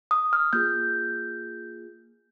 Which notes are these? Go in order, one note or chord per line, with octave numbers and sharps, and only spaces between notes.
D#6
F6
A#3 F4 G#4 G6